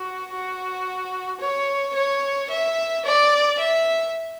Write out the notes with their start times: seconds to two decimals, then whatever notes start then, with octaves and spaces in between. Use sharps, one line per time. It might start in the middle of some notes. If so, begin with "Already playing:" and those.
Already playing: F#4
0.31 F#4
1.40 C#5
1.95 C#5
2.50 E5
3.05 D5
3.59 E5